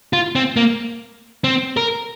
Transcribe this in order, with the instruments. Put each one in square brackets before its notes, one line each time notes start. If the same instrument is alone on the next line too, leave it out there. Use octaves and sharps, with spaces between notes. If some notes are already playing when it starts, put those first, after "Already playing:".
[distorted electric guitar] F4
C4
A#3
C4
A#4